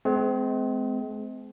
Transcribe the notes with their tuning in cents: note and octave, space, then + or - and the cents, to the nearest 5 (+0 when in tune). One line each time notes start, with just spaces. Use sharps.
G#3 +35 C4 -30